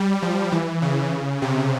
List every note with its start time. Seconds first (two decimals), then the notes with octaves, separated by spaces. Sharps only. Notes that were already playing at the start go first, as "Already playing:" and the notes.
Already playing: G3
0.22 F3
0.52 E3
0.82 C#3
1.42 C3